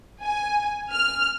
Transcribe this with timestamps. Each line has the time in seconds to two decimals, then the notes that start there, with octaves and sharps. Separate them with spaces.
0.23 G#5
0.91 F6